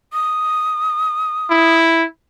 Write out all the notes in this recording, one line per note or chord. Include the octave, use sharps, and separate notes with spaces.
D#6
E4